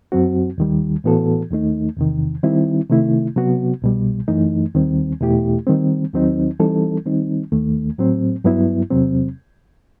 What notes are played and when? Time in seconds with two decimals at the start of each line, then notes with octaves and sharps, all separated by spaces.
0.12 F#2 F#3 C4 F#4
0.58 D#2 D#3 G3
1.04 A2 E3 B3 F#4 A4
1.51 D#2 D#3 A3 D#4
1.97 E2 C3 D#3
2.43 D#3 G3 C4 E4
2.89 C3 D#3 A3 E4
3.36 C3 F#3 B3 F#4
3.82 C2 B2 G3
4.28 F#2 E3 A3 D#4
4.75 D#2 D#3 G3 C4
5.21 E2 B2 A3 E4 G4
5.67 D#3 G3 C4
6.13 D#2 D#3 F#3 C4 D#4
6.59 E3 G3 C4 D#4 A4
7.06 D#3 G3 C4 D#4
7.52 D#2 D#3 A3
7.98 A2 F#3 C4
8.44 G2 F#3 B3 E4
8.90 E2 C3 F#3 C4